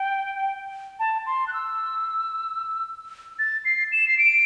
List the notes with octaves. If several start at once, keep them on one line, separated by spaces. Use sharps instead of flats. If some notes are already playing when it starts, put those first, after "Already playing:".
Already playing: G5
A5
C6
F#6
E6
A6
C7
E7
C7
D7